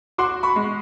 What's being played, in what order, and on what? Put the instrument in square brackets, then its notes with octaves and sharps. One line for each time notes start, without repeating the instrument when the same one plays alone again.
[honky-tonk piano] F#4 [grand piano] C6 D6
[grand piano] B5 C#6
[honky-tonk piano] G#3